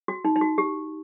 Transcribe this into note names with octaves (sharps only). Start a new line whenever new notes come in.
F#4
D#4
D#4
F#4
G4